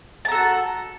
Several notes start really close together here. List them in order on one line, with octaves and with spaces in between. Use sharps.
A5 A#5 A4 F#4